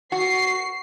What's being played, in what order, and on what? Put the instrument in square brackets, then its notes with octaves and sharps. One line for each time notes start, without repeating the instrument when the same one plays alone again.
[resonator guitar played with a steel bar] F#4 [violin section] C7